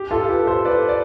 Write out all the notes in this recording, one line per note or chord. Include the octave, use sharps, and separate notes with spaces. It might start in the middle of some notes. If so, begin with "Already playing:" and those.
Already playing: G4
F4 A4
G4 B4
A4 C5
B4 D5
D5